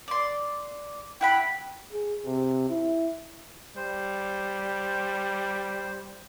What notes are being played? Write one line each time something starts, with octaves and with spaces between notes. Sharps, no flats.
D5 C6
E4 F#5 G5 B5
G#4
C3
E4
G3 C5